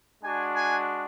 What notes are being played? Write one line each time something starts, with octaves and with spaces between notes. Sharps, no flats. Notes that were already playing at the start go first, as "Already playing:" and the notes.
G#3 D4 F#4 G#5
G#5